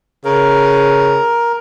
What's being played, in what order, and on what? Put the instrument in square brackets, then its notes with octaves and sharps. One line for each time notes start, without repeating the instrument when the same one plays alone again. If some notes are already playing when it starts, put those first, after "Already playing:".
[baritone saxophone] C#3 [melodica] A#4